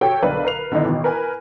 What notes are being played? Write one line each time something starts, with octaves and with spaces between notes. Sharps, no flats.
F#4 G4 A4 C#5 G5
B1 D3 A#4 B4 D5 F5
A#4 B4 C7 F7
D3 D#3 B3 D#4 E4
A1 B2 D#3
A#4 B4 G#5